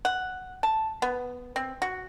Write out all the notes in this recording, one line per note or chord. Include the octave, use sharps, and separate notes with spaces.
F#5
A5
B3
C4
F#4